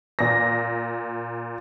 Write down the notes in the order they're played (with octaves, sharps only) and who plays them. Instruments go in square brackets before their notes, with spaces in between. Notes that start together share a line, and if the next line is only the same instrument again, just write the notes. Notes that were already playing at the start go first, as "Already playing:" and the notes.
[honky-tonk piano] A#2 A#6